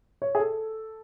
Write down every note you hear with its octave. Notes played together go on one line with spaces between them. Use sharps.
C#5
G#4
A4